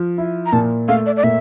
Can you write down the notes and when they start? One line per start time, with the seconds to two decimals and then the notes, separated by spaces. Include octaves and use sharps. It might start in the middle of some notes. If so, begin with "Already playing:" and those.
Already playing: F3
0.18 E4
0.46 A#5
0.52 A#2 A5
0.88 A3 F5
1.06 D5
1.16 D5
1.23 A#2 E5